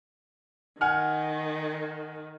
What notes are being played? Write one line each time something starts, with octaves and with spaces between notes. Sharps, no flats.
D#3 F#5 G#5 F6